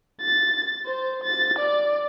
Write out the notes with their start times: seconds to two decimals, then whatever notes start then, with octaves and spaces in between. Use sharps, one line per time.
0.22 A6
0.86 C5
1.24 A6
1.59 D5